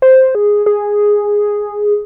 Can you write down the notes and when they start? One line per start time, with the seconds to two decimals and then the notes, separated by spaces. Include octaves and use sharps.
0.02 C5
0.35 G#4
0.66 G#4